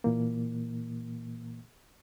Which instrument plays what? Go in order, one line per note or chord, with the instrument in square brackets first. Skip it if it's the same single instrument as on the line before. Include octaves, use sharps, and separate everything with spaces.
[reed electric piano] A#2 E3 A#3